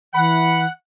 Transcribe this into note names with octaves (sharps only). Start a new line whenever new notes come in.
E3 F#5 B5